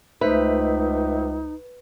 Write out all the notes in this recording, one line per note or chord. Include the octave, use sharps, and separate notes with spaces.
C#2 A3 D#4 B4 C5 E5